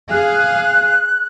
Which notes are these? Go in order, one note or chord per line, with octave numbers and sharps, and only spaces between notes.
G#4 F5 F#6